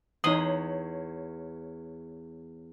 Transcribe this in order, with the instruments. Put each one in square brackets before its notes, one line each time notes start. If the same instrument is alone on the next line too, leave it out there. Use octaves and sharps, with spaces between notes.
[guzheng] E2 C6 [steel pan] D#4 D#6 [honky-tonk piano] C#5 F#7